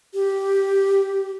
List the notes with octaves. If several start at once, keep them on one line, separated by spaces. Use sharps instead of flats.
G4